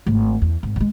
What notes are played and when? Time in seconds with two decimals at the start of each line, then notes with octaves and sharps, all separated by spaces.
0.06 G#1 A3
0.42 E2
0.63 G#1
0.76 F3 G#3